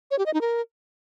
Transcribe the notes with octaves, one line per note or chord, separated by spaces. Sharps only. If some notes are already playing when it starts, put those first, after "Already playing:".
C#5
G4
D#5
D#4
A#4